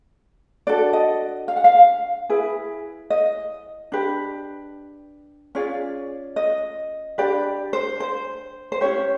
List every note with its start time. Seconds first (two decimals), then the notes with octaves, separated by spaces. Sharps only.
0.67 D4 F#4 A4 D5
0.93 D#5
1.48 F5
1.56 F#5
1.64 F5
2.30 E4 G#4 B4
3.10 D#5
3.92 D4 G4 B4
5.55 C#4 F4 G#4 D5
6.36 D#5
7.18 D4 G4 B4 D5
7.73 C5
8.00 C5
8.72 C5
8.81 C#4 E4 G4 C#5